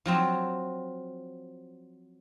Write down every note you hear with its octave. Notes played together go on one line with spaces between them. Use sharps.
F3 F#3 C4